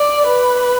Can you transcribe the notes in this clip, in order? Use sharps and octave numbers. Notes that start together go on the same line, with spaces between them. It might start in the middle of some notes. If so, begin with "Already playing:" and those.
Already playing: D5
B4